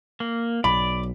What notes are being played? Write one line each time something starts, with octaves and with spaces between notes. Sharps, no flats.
A#3
B1 D5 B5